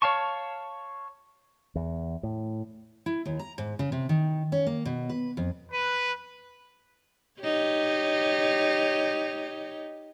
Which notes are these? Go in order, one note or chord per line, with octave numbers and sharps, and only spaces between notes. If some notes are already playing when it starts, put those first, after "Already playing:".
C#5 F5 A5 C#6
E2
A2
E4
D#2
A#5
G#2
C#3
C3
D#3
C#4
A#3
B2
B4
F2
B4
D#4 G4 C#5